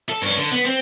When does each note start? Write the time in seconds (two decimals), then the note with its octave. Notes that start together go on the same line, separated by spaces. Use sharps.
0.09 A4
0.22 G2 C#4
0.38 D3
0.51 B3
0.65 C4